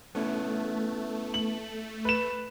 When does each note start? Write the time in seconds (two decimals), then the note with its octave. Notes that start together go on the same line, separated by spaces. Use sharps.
0.15 A3 B3 C#4 E4
1.34 F#7
2.05 B4 E7